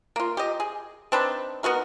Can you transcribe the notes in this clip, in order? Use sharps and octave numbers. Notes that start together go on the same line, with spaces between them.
A#3 F4
G4 D#5
G#4
C4 D4 D#4 B4
B3 D#4 F#4 A#4